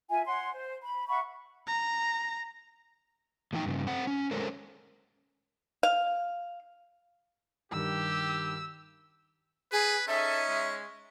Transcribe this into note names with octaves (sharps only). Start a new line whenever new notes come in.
F4 E5 G#5
C#5 F#5 C6
C5
B5
E5 F#5 B5 C#6
A#5
A2 E3 F3 D#4 G5
G2 C#3
A3 C4 C5 F#5
C#4
G#3 A4 A#4 C5 C#5
F5
G2 D#3 G4 E6
G#4 B4
C#4 D#4 A4 C#5 E5
G#3